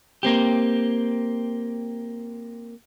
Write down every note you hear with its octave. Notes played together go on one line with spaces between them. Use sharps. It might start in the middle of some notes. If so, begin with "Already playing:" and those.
A#3 C4 G4